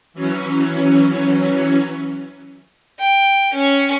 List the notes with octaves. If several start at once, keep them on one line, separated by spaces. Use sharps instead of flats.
E3 F#3 C#4
G5
C#4